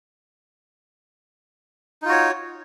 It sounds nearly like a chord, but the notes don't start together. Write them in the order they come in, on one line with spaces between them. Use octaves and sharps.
D#4 F4 F#4 C#5